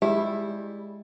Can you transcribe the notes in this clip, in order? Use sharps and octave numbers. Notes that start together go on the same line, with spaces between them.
G3 G#3 E4 G4